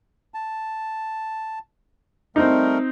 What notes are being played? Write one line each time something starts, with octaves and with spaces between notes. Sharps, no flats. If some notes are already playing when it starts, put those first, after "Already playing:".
A5
G3 A3 C4 D#4 A#4